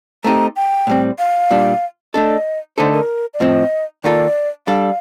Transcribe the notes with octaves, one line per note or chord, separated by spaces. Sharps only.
A3 C4 D#4 G4 A#5
G5
A2 G3 C4
F5
A#2 G3 D4
A3 D4 A4 D#5
D3 A3 D#4 A4 C5
A#4
D5
A2 F3 C4 D#5
D#3 A#3 F4 A4 D5
G3 D4 A4 F5